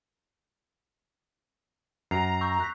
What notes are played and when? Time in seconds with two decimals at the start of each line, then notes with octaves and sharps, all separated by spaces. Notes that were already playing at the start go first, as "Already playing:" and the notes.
2.11 F#2 A#5 C7
2.41 C#6 E6 G6
2.60 F#6 B6